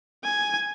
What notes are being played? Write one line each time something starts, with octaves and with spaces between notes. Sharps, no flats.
G#5